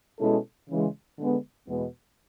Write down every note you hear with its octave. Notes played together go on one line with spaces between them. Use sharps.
B2 G#3 C#4 E4 A4
C#3 E3 G#3
D3 G#3 B3
E2 B2 G#3 B3